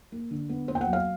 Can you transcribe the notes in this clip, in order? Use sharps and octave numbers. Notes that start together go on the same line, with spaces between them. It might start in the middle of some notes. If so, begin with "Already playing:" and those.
A#3
D3
B3
A#3 C5
G5
F#5
F#3
F5